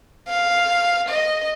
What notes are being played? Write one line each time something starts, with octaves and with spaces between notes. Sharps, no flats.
F5
D#5